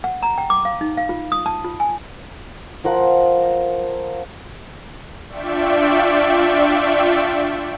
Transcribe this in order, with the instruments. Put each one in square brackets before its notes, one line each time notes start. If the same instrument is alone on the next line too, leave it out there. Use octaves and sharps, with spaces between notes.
[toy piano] F#5
A#5
G5
D6
F5
D#4
F5
F4
D#6
A5
F4
G#5
[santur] F3 A#4 F#5
[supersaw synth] D4 F4 D5 E5 G5 C#6